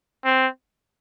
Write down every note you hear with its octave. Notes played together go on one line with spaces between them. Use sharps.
C4